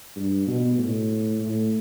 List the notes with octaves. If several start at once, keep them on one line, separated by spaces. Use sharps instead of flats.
G2
B2
A2
A2